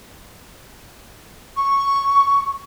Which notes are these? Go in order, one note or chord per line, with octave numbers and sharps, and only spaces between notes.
C#6